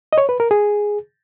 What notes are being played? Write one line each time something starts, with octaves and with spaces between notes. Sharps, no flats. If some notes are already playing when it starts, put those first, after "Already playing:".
D#5
C#5
B4
A#4
G#4